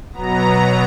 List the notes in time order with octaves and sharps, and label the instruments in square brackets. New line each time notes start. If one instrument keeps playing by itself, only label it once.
[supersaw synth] B2 F#3 B3 A#5